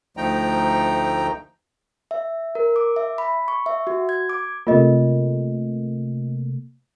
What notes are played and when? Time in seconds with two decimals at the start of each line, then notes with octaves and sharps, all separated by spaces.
0.17 D2 F3 A3 D#4 G5 A#5
2.11 E5
2.55 A#4
2.76 D6
2.96 E5
3.18 B5
3.48 C#6
3.66 E5
3.87 F#4
4.09 G#6
4.29 D6
4.67 C3 A3 A#3 F4 D#5